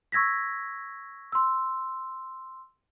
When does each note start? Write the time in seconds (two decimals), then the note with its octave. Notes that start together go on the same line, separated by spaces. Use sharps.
0.12 C#6 E6 G#6 A#6 B6
1.32 C6 E6